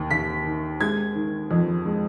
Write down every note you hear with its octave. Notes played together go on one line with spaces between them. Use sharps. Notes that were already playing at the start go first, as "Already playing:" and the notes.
Already playing: D#2
D#2 B6
D#3
G#3 G#6
D#3
F2
G#3